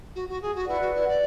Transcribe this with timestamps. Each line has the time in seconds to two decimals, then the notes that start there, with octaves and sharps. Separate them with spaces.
0.15 F#4
0.28 F#4
0.41 G#4
0.55 F#4
0.67 E4 B4 D5 F#5
0.81 F#4
0.94 E4
1.08 D5